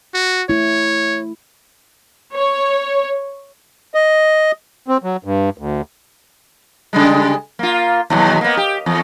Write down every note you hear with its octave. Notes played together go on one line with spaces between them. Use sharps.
F#4
A3 E4 C#5
C#5
D#5
C4
F#3
G2
D2
C#3 G3 G#3
A#3 F4
D#2 B2 F#3
A#3 B3
G4
E2